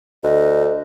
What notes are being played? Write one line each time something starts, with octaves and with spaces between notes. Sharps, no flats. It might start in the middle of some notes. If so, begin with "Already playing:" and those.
D2 D#5